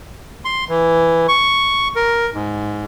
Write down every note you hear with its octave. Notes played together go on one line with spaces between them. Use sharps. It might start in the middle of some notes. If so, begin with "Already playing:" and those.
C6
E3
C#6
A#4
G#2